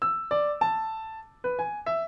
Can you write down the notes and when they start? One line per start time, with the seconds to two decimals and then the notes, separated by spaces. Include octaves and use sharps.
0.02 E6
0.31 D5
0.61 A5
1.44 B4
1.59 G#5
1.86 E5